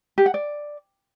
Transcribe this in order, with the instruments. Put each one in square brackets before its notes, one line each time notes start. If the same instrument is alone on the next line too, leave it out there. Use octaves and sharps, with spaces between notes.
[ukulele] G4
F#5
D5